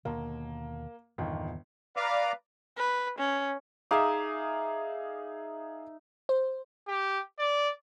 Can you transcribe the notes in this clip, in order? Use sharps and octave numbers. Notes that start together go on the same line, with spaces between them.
D#2 B2 D3 A#3
G1 E2 A#2 D3 D#3
B4 D5 F5 A#5 D6
B4
C#4
D#4 G#4 E5 F5 D6
C5
G4
D5